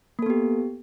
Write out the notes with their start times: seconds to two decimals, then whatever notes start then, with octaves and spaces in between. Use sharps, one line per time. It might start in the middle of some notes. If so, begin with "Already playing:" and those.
0.19 A#3
0.22 A4
0.26 B3
0.30 G4